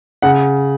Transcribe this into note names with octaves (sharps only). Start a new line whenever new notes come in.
C#3 F#5